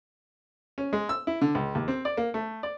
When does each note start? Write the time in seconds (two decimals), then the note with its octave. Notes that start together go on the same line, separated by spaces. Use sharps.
0.78 C#4
0.93 G#3
1.09 E6
1.27 E4
1.41 D3
1.55 C#2
1.75 D#2
1.88 C4
2.05 D5
2.17 A#3
2.34 A3
2.63 D5